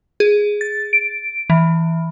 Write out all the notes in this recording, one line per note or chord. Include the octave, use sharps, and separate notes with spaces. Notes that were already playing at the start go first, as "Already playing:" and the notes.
G#4
A6
D7
E3